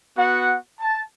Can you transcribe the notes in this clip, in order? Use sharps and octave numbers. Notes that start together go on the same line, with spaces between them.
B3 F#4 F#5
A5